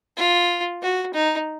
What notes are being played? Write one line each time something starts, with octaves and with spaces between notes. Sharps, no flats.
F4
F#4
D#4